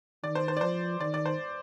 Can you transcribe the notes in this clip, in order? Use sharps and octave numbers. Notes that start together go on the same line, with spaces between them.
D#3 D5
C5
C5
D5
F3 C5
D#3 D5
D5
C5